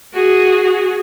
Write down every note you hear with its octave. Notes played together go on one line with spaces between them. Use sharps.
F#4 G#4